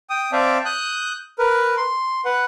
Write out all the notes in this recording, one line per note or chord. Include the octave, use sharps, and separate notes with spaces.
G5 D#6
C4 D5 E5 F5 G5 A5
D#6 F#6 G6
A#4 B4
C6
B4 F#5